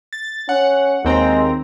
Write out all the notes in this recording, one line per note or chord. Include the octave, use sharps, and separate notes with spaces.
A6
C#4 F#5
D#2 G#3 C4 A#5